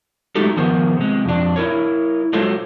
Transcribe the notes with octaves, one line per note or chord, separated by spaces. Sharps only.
F#3 G#3 A3 D#4 G4 A4
D#3 F3 B3 G#4 A#4 C5
C3 G#3
F2 D4
E4 A#4 C#5
F#3 G#3 F4 A4 C5 C#5